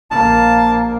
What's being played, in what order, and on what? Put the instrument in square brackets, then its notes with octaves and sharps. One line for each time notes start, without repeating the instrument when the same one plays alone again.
[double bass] A#1 A#3 [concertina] A5